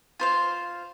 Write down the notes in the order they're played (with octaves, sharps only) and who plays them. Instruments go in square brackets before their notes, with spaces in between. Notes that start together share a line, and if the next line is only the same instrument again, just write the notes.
[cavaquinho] F4 C5 F5